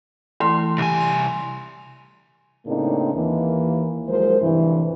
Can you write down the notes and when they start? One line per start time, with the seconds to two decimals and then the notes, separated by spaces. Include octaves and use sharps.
0.40 E3 A3 E4 C6
0.78 C2 G4 G#5
1.01 F7
2.66 A2 C#3 A#3 C4 D4 D#4
3.13 D#2 E3 A#3
4.08 D#2 F3 F#3 G#3 A#4 C5
4.40 D2 G2 C3 E3